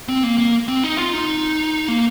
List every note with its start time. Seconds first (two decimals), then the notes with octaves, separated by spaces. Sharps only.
0.08 C4
0.23 A#3
0.38 A#3
0.68 C4
0.83 D#4
0.98 F4
1.13 D#4
1.88 A#3